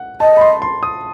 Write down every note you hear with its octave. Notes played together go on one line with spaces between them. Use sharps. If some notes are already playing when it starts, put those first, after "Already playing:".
Already playing: F#5
D#5 A5
B5
C6
C6
D#6